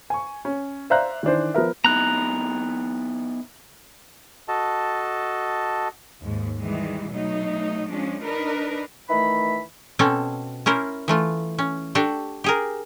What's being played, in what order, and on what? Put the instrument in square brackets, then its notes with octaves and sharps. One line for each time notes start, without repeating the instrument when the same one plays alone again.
[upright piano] G#5 C#6
C#4
C5 D5 E5 F5 A#5 F#6
D#3 E3 D4 C5
F3 B3 A#4 E5
[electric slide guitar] B3 D#4 E4 [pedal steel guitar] A#5 F#6
[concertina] F#4 A4 D#5 A5
[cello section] D#2 G#2
D#3 E3 G3 G#3
B2 F#3 A3 D#4
F3 G#3 C#4 D4
D4 D#4 A#4 B4
[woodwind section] D#3 E3 A3 B5
[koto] B2 C4 C#4 A4
C#4 E4 A#4 C5
E3 A3 F4
C#4
D4 F#4 G4 A4
G4 G#4 A#4